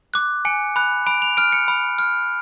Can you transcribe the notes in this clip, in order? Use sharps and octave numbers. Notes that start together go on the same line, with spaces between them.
D6 F#6
G#5 C#7
B5 F#6
B5 D7
F7
F6 D7
C#7
B5
F6